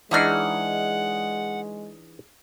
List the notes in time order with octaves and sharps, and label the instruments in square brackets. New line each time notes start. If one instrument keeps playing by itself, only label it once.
[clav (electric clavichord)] E3 D4 D#4 [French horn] G#3 [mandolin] G#4 C#5 F6 [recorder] F#5